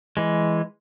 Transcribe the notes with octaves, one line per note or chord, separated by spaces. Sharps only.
E3 G#3